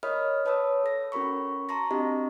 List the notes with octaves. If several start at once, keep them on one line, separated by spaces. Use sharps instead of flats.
A#4 C#5 D#5 B5 D#6 F6
B4 C#5 A5 B5 D#6 E6
A4 A#6
C#4 F#4 A#4 B5 C#6
A5 A#5 C6 C#6 A#6
C4 D4 F#4 G4 D#5